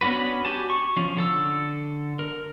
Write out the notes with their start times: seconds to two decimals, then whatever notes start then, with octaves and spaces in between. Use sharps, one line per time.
0.01 B3 C#4 D4 F#4 B4
0.45 F#4 G4 G#5 A5
0.70 C#6
0.97 F3 C#4
1.17 D3 A4 E6
2.19 A#4